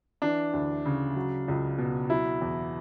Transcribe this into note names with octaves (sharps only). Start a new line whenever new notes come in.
E3 D4
D2
C#3
F#3
C#2
B2
F#3 E4
E2